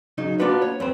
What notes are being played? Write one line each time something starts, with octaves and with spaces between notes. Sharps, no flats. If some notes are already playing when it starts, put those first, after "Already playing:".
C#3 F#3 D#4
A#3 B3 D4 F4 F#4 B4
C#5
F2 B3 C4